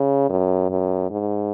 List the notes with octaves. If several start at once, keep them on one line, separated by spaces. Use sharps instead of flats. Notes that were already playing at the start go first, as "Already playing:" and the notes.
Already playing: C#3
F#2
F#2
G#2